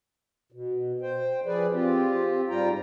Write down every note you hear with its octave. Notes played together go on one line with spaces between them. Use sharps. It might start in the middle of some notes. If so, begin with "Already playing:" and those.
B2
C5 G5
F3 G#4 B4 D5
C4 F4 G4
G#2 G3 F4 G5 A#5